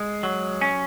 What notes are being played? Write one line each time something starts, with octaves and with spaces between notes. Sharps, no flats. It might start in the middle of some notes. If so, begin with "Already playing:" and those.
Already playing: G#3
F#3
C#4